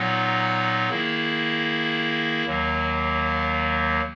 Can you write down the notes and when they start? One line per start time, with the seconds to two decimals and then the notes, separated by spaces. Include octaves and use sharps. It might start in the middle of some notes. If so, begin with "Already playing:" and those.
Already playing: A#2 F#3 B3 D#4
0.89 D#3 A#3 E4 G#4
2.45 D#2 D#3 F#3 A#3